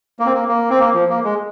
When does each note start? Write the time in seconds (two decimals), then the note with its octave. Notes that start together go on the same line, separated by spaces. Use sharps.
0.19 A#3
0.26 C4
0.34 A#3
0.48 A#3
0.70 C4
0.79 A#3
0.94 F3
1.09 A#3
1.24 G#3